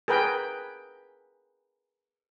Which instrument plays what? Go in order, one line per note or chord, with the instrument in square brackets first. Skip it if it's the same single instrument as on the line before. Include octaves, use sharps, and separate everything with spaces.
[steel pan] G#4 A#4 B4 G5